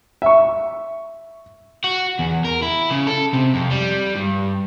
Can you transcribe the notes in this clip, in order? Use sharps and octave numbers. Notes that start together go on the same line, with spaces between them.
E5 C#6
F#4
E2
A#4
E4
C#3
A4
C3
F2
G3
G2